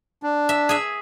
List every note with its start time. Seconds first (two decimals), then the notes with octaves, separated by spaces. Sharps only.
0.23 D4
0.49 E5
0.69 G#4 E5